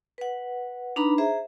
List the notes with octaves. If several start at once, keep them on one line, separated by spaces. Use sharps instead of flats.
B4 F#5
D4 D#4 B4 A#5 B5
G#4 C5 E5 A#5